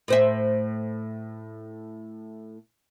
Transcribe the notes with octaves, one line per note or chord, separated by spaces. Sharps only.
A2 C5 E5